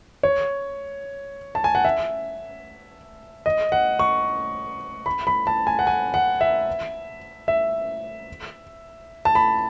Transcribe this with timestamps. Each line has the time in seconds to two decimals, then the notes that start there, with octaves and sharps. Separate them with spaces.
0.23 C#5
1.55 A5
1.64 G#5
1.75 F#5
1.84 E5
3.46 D#5
3.72 F#5
3.99 C#6
5.06 B5
5.27 B5
5.47 A5
5.67 G#5
5.79 F#5
5.87 G#5
6.14 F#5
6.41 E5
7.48 E5
9.25 A5
9.35 B5